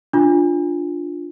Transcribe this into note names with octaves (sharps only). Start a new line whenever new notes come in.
D4 F4